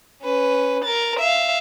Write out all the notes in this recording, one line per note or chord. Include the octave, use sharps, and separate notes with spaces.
C#4 B4
A#4 A6
E5 F5